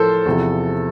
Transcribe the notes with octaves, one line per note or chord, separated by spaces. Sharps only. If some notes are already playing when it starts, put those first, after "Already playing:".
Already playing: A2 F3 A4 A#4 C5
E2 C3 F3